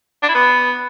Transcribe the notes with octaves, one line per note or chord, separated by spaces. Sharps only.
D4
E4
B3